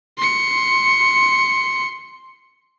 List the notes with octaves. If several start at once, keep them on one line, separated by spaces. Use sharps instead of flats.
C6 C#7